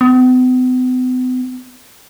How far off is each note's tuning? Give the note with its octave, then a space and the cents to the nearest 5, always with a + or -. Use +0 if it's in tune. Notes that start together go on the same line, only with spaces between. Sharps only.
B3 +45